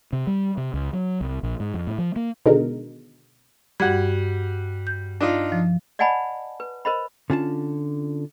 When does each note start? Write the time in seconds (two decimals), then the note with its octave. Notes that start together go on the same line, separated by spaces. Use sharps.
0.13 C3
0.27 G3
0.57 C3
0.74 C#2
0.93 F#3
1.21 C2
1.43 A#1
1.60 G#2
1.74 F2
1.87 A2
1.98 F3
2.16 A#3
2.46 B2 D3 D#3 G#3 D#4 A#4
3.80 G2 G3 F#4 F#5 G#6
4.87 G6
5.21 D4 D#4 F4
5.52 F3
5.99 D5 D#5 F#5 G#5 A5 B5
6.60 B4
6.85 A#4 C5 D#5 B5
7.30 D3 C#4 F4 A5